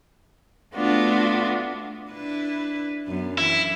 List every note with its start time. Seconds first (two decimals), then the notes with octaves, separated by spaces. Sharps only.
0.74 A3 B3 D4 F4 F#4
2.12 D4 E4 B4
3.07 F#2 B3
3.38 E3 E4